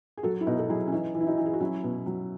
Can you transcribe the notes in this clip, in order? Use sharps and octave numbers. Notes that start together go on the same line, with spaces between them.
G#4
F#3 F#4 A4
E4
B2 D#4 F#4
A4
F#3 E4 G#4
C#4
E3 D#4
E3
E4
D#4 F#4
E3
G#4
F#4
F#3 C#4 E4
B2
F#3